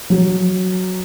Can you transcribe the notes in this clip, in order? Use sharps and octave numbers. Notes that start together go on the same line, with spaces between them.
F#3